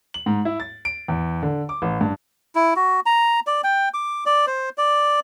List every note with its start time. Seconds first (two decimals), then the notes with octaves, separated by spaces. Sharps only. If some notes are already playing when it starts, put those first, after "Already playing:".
0.14 F#7
0.26 G#2
0.45 E4
0.60 A6
0.85 D7
1.08 E2
1.43 D3
1.69 D6
1.82 A1
2.01 G2
2.55 E4
2.76 F#4
3.06 A#5
3.47 D5
3.64 G5
3.94 D6
4.26 D5
4.47 C5
4.78 D5